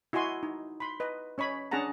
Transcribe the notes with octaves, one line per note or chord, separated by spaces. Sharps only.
E4 F#4 D#5 G#5 C6
D#4
B5 C6
B4 D#5
C#4 C#5 D#5 B5
C#4 D4 G#4 F#5 A5 A#5